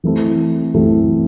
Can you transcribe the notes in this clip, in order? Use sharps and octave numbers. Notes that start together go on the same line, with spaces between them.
E3 A3 C4 E4 A4
E3 A3 C4 E4 A4